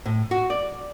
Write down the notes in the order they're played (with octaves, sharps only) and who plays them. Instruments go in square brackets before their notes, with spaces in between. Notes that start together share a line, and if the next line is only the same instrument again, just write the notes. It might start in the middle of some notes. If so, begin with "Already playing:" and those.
[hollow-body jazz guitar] A2
F#4
D5